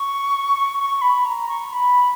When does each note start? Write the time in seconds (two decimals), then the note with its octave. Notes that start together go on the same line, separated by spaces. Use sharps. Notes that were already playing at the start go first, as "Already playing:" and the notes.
Already playing: C#6
0.79 C#6
1.02 B5
1.25 A#5
1.49 C#6
1.73 B5